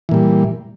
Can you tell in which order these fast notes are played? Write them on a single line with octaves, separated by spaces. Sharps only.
E3 A#2 G3